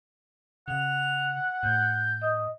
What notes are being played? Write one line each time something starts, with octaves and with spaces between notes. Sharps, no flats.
C#3 F#5 F7
A2 G6
D#5